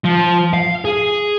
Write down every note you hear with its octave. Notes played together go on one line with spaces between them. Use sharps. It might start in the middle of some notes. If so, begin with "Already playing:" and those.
F3
F5
G#4